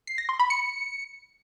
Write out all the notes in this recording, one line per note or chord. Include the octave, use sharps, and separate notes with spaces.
C7
A#6
C6
B5
C#7